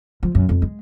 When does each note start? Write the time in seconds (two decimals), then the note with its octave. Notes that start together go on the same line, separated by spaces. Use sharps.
0.23 F3
0.35 F#2
0.49 F2
0.62 G#3